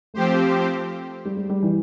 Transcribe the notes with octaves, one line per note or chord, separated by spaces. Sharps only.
F3 A3 C4 G4 C5
G3
G3
G3
E3